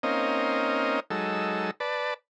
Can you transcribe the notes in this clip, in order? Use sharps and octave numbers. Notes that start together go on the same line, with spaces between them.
A#3 C4 C#4 D#4 D#5 F5
F#3 G#3 D#4 A4 E6
B4 D5 A5